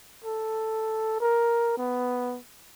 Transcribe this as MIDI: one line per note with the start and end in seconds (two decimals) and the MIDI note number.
0.24 1.18 69
1.20 1.74 70
1.77 2.39 59